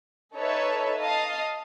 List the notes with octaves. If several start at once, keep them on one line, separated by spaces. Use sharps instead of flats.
D#4 A4 B4 C#5 E5
D#5 F5 A5 D#6